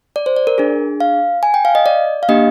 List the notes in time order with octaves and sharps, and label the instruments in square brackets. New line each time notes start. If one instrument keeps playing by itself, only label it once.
[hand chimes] D5
C5
D5
A#4
D4 G#4
F5
G#5
G5
F5
D#5
D5
F5
A#3 D4 G4 D#5